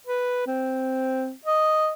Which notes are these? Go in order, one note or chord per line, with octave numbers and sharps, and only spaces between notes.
B4
C4
D#5